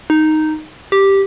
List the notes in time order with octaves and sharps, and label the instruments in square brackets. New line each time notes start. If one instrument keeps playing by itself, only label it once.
[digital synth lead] D#4
G4